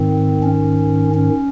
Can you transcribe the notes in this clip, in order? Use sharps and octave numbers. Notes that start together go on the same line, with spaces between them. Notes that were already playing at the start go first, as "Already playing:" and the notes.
Already playing: G#2 D#3 C4
C#4
C#4